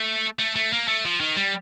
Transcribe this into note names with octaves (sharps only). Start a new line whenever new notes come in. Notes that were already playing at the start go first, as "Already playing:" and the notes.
Already playing: A3
A3
A3
A#3
A3
F3
D#3
G3